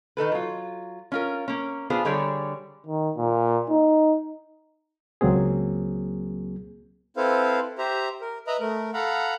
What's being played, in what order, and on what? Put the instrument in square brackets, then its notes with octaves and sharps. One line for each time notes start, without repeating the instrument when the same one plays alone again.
[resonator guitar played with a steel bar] D#3 D#4 A4 B4
F#3 F4
C#4 F4 A#4
A#3 C#4
B3 D4 F4 G#4 A4 C5
D3 G3 G#4 C#5 D5
[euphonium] D#3
A#2
D#4
[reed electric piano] C#2 F#3 A#3 C4 G#4
[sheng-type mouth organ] C4 E4 A4 B4 C5 F5
G4 C5 E5 A#5
A#4
B4 D#5 E5 A#5 B5
A3 A#4
A4 F5 F#5 A#5 B5